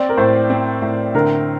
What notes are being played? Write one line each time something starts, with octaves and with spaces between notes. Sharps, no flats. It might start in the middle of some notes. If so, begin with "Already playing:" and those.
Already playing: C4 D5
A#4
A2 C5
C4
A2
D3 A#4